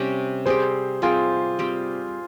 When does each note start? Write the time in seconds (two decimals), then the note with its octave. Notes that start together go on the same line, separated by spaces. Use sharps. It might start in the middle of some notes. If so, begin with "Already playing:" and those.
Already playing: C3 G3 C#4 G4
0.46 G3 C4 G4 G#4 C5
1.02 G3 C4 F4 G4 G#4
1.59 G3 C4 G4